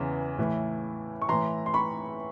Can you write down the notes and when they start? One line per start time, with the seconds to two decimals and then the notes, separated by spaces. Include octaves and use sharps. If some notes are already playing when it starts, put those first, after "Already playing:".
Already playing: E2 C#3 E3
0.38 A2 E3
1.22 C#6
1.29 A2 E3 A#5 C6
1.66 C6
1.74 B5 C#6